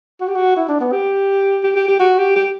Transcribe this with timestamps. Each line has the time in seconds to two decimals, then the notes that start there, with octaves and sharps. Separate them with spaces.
0.20 F#4
0.28 G4
0.35 F#4
0.56 E4
0.68 D4
0.80 B3
0.92 G4
1.63 G4
1.76 G4
1.88 G4
1.99 F#4
2.18 G4
2.36 G4